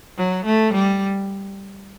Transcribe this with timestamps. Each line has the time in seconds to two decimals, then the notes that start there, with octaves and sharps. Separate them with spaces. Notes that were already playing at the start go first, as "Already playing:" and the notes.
0.18 F#3
0.45 A3
0.74 G3